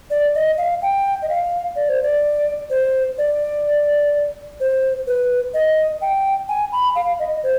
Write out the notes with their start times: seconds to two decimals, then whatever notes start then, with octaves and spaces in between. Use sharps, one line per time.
0.10 D5
0.35 D#5
0.58 F5
0.82 G5
1.22 D#5
1.29 F5
1.76 D5
1.89 C5
2.03 D5
2.70 C5
3.18 D5
4.60 C5
5.07 B4
5.54 D#5
6.02 G5
6.49 G#5
6.72 B5
6.96 F5
7.19 D#5
7.44 C5